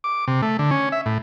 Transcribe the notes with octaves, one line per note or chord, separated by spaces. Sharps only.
D6
C3
A3
D3
C#4
E5
A2